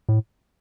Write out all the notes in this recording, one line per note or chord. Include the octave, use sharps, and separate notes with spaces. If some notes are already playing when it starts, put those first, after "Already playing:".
A2